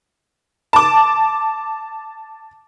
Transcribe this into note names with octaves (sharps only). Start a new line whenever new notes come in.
A5 D6